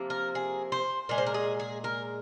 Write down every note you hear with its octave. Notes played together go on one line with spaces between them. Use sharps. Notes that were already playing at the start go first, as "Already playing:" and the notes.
Already playing: C3 F3 A#3
A#4
G#4
C5
A#2 G#3 A#4
C5
A#4
G#4
G#4
A#4